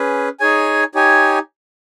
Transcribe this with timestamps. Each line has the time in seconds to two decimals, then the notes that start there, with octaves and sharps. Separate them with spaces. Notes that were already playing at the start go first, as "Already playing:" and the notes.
Already playing: C#4 G#4 B4
0.40 D#4 G#4 C#5 G#5
0.95 D#4 G4 C#5 G#5